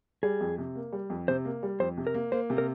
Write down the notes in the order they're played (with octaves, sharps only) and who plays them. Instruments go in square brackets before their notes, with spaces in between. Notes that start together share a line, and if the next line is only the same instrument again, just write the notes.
[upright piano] G3 [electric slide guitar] G#4
[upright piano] F2
C3
A#3
G3
F2
[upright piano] C3 [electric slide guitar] C5
[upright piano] A#3
G3
[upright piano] F2 [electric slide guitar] C5
[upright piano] C3
[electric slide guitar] A#4
[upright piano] A#3
[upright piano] A#3 [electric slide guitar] C5
[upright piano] C3
[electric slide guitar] A#4